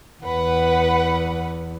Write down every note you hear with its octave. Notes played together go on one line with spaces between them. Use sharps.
E2 B4 F#5